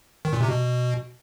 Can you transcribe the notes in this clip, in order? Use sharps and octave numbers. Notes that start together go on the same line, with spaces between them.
D#3
A#2
C3
B2